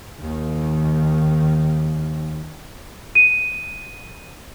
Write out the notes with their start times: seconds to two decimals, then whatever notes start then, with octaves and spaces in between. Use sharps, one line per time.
0.20 D#2 D#3
3.15 D#7